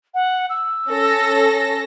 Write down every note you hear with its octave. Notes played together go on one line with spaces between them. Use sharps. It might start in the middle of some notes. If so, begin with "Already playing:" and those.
F#5
E6
C#4 A4 A#6